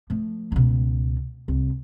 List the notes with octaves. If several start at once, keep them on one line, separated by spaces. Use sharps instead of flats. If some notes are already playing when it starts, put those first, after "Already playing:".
F3 A3
C#2 B2
C2